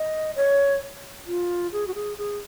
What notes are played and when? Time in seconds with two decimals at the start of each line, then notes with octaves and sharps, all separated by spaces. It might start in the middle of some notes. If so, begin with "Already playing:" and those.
Already playing: D#5
0.36 C#5
1.27 F4
1.72 G#4
1.87 F#4
1.95 G#4
2.18 G#4